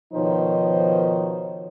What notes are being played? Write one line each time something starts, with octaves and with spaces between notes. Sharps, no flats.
B2 D#3 F3 D#4 C5 C#5